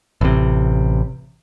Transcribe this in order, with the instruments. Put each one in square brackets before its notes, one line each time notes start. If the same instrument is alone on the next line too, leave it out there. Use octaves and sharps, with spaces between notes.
[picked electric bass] A1 C3